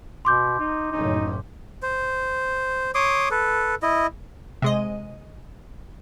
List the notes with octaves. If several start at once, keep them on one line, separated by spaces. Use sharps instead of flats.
B2 C6 D6 G6
D#4
F#1 A2 C#4 D#4
C5
C#5 C6 D6 D#6
A4 B4
E4 D#5
C3 G#3 D#5